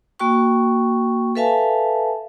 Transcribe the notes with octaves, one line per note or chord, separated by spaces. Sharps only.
A#3 F#4 G5 C#6
A4 B4 E5 F5 G#5 A5